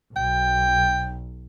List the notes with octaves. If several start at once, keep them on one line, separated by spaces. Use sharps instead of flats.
B1 G5